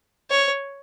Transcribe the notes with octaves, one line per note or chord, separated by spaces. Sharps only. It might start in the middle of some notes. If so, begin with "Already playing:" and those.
C#5